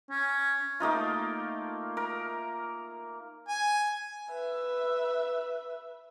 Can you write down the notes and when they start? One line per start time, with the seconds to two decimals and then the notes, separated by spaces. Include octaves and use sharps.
0.10 C#4
0.80 A3 A#3 D#4 F4
1.97 A#4
3.49 G#5
4.31 B4 E5